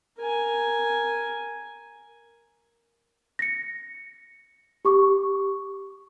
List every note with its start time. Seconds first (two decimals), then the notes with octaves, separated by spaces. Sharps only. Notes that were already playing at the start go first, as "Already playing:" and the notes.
0.19 A#4 G#5
3.39 A#6 C#7
4.85 G4 C#6 D6